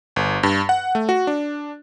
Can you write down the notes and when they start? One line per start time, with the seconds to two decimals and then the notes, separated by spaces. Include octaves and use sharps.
0.16 G1
0.43 G2
0.69 F#5
0.95 A3
1.09 F#4
1.27 D4